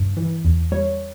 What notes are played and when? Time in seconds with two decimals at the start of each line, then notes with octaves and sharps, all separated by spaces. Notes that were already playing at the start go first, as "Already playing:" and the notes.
Already playing: G2
0.17 E3
0.45 E2
0.72 G3 C#5